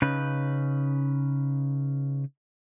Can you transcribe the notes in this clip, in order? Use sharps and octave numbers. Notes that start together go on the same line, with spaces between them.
C#3 C#4 D#4 B4